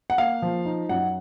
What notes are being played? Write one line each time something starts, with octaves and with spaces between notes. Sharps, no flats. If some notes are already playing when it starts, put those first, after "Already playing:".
F#5
A#3 F5
F3
D#4
F#2 F#5